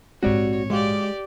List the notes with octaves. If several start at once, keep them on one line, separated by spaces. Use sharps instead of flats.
A#1 G#2 G#3 C4 F#4 G4 C#5 D5
G#3 F#4 G4 D5 D#5 F5